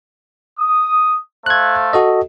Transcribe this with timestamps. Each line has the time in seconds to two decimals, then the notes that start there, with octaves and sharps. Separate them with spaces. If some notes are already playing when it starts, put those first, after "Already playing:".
0.60 D#6
1.46 A3 C5 F5 F#6 G#6
1.93 F#4 A4 D#5